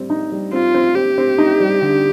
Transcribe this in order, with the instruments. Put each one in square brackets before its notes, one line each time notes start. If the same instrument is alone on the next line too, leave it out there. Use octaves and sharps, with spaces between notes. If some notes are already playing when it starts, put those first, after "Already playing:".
Already playing: [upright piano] G3 C4
D#4
G3
[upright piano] C4 [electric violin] F4
[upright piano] C4
[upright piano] C4 [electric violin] G4
[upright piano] C4
D#4
G3
D3